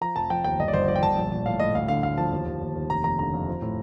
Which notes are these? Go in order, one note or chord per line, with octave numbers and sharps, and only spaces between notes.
F3 A#5
F1 A5
F3 G5
D#2 G5
G1 D#5
D5
G1 C5
F3 D5
G5
G1 A5
A#1
A#1
A2 F5
A2 D#5
D2 F5
D3 F5
D2 F5
F3 A5
D#2
D#2
D#2
D#2
F1 A#5
F1 A#5
D3 A#5
F2
F3
A2